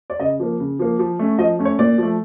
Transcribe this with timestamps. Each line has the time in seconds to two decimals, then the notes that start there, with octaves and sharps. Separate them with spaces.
0.10 D5
0.20 C#3 D#5
0.40 F3 A#3
0.60 C#3
0.79 F3 A#3
0.99 F3
1.19 A3 C#4
1.39 F3 D#5
1.59 A3 C#4
1.65 C#5
1.79 A#2 D5
1.98 F3 A3